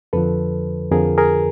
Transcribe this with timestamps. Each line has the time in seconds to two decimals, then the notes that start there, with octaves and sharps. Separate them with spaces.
0.13 F2 D3 F3 A4 B4
0.92 F2 D3 F3 G#4 A#4
1.18 G#4 A#4